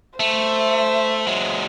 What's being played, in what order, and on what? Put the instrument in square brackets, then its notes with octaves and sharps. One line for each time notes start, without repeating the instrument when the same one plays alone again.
[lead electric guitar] A3 [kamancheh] C5 E5
[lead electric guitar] F#3 G#3